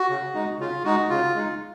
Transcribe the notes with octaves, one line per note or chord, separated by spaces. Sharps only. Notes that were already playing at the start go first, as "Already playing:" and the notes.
Already playing: F#4
C#3
G#3 D#4
C#3 F4
G#3 D#4 F#4
C#3 F4
G#3 D#4